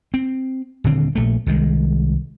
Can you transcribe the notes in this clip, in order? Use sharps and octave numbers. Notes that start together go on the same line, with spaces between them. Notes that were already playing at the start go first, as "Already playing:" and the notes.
C4
D#1 D3 C4
A#1 A3
C2 D#3 G#3